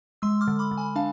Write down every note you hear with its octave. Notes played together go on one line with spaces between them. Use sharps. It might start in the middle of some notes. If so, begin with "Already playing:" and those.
G#3 C6 E6
D6 F6
D3
B5 D6
D3
G#5 B5
D4 F5 A5